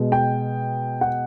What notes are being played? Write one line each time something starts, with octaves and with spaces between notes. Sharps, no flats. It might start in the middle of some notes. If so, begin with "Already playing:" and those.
Already playing: B2 G#3
G5
F#5